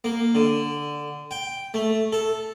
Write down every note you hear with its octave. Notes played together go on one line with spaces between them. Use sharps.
A#3
D3
G5
A3
A4